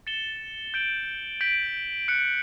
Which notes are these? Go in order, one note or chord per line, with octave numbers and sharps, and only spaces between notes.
A6 C#7 E7 G7
G6 D7 F#7
G6 B6 D7 F#7
F#6 C#7 F#7